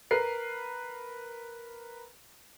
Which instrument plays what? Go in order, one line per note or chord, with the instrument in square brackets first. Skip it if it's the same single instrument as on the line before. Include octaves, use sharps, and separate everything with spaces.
[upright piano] A#4 B4 C7